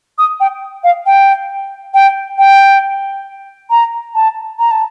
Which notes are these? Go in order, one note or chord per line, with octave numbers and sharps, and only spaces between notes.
D#6
G5
F5
G5
G5
G5
A#5
A5
A#5
A5